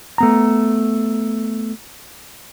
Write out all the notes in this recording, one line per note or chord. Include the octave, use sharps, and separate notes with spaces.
A3 B3 A#5